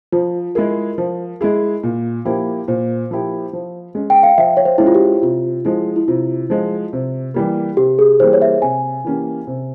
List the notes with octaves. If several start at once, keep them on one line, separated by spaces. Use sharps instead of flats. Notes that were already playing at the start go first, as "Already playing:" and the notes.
F3 F4
G#3 E4 G#4 A#4
F3
G#3 E4 G#4
A#2
F3 A#3 E4 G4
A#2 C5
F3 A#3 E4 G4
F3
G#3 C#4
G5
F5
F3 E5
C#5
C5
G#3 C#4 E4
F4
G4
C3 F4
F3 G#3 E4
E4
C3 F4
F3 G#3
C3
E3 G3 A#3
C3 G4
G#4
E3 G3 A#3 C5
C#5
E5
C3 G#5
E3 A#3 C#4 G4
C3